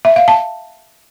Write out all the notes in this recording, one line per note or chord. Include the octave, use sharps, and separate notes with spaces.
E5
F5
A5